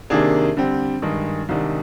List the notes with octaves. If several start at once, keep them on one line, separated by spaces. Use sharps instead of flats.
C3 D#3 A#3 D4 G#4
D3 G3 C4
G2 D#3 G#3
C2 C3 D#3 G#3 D4